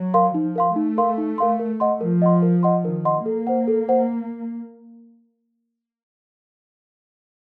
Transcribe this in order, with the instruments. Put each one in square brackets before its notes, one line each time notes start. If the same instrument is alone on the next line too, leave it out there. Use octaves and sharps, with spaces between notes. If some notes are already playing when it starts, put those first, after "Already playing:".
Already playing: [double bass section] F#3
[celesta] A#4 F5 C6
[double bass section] F3 [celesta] D#4
[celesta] A#4 F5 C6
[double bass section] A3 [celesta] D#4
[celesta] A#4 F5 C6
D#4
A#4 F5 C6
A#4
D#5 F#5 C6
[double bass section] F3 [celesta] A#4
[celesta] D#5 F#5 C6
A#4
D#5 F#5 C6
[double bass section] D#3 [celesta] A#4
[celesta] D#5 F#5 C6
[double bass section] A#3 [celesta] A4
[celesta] C5 F#5
A4
C5 F#5